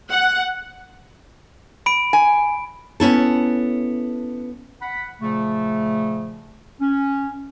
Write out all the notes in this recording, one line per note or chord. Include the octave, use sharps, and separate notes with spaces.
F#5
B5 D7
G#5
B3 C#4 E4 A4
F#5 B5
A#2 C#3 F3 A3
C#4